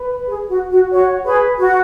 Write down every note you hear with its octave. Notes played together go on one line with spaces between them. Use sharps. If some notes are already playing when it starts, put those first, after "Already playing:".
Already playing: B4
G#4
F#4
F#4
F#4 C#5
G#4 B4
F#4